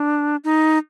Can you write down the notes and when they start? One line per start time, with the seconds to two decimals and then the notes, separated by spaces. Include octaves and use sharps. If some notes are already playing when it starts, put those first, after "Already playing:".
Already playing: D4
0.44 D#4